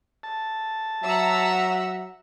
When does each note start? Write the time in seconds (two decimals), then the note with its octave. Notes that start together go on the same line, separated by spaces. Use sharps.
0.23 A5
1.04 F#3 E5 F#5 A#5 E6